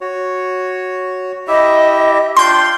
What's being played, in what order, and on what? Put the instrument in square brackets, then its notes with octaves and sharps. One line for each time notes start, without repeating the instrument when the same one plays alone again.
[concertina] F#4 C#5
[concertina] E4 G4 E5 [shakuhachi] D#5
[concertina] D4 G5 [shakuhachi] F4 [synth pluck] C6 G6